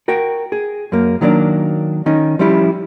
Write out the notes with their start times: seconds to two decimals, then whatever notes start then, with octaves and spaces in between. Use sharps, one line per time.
0.08 F#4 A#4 G5
0.52 G#4
0.92 F#2 A#3
1.21 D#3 F#3 A#3 D4
2.06 D#3 C#4 D#4
2.39 F3 G3 C#4 E4 G4